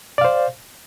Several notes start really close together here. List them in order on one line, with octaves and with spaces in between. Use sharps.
D5 F5 C5